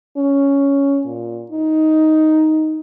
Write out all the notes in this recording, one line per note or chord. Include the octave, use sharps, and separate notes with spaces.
C#4
A#2
D#4